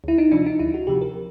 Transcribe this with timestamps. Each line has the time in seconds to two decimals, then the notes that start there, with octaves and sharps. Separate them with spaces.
0.04 D2 E4
0.18 D#4
0.32 C3 F3 D4
0.46 D#4
0.59 D2 E4
0.74 F#4
0.87 C3 F3 G4
1.01 A#4